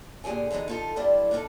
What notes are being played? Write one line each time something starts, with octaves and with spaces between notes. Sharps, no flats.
A#2 D3 G4 G#4 G#5
E2 D3 E3 G#3 D#4
D#4 F4 A4
G2 G3 E4 A4 C5 D5
D4 D#4 F4 G#4 A4